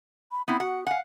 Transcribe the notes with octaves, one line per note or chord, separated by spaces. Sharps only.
B5
B3 C4 E4 B5
F#4 F#5
F5 F#5 G#5